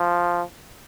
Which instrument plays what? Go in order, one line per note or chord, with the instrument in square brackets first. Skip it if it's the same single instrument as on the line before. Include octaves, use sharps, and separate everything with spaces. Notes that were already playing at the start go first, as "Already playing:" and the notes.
Already playing: [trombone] F3